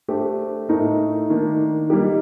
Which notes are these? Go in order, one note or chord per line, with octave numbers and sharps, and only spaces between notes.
A3 D4 G4 C5
A2 A3 D#4 A#4
D#3 A#3 D4
G3 A#3 D#4 G4